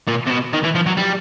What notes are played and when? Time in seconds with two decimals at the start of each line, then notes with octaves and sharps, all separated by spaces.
0.08 A#2
0.27 C3
0.30 B2
0.53 D#3
0.64 E3
0.75 F3
0.86 F#3
0.97 G3